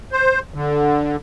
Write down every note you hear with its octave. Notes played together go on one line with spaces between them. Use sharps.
C5
D3